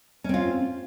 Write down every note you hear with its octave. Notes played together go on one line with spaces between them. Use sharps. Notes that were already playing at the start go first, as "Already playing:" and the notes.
C4 C#4 F4